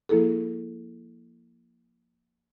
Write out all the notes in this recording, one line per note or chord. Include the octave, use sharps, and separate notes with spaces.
F3 A#3 E4 G#4 A4